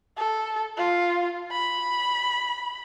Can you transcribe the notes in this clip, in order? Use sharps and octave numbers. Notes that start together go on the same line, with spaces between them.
A4
F4
B5